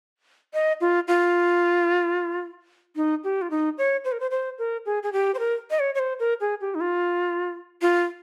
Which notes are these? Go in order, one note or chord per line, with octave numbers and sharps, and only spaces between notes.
D#5
F4
F4
D#4
G4
F4
D#4
C#5
C5
A#4
C5
C5
A#4
G#4
G#4
G4
C5
A#4
D#5
C#5
C#5
C5
A#4
G#4
G4
D#4
F4
F4